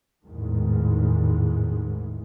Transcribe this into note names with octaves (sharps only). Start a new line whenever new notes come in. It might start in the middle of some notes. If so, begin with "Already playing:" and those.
A1 E2 G#2 D#3